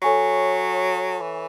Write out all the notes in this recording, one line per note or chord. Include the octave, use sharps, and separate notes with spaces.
F#3 A4 C#5 G#5 C#6
E3